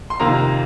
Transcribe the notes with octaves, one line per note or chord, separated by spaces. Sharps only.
C6
F2 C3 D#3 A#3 A#5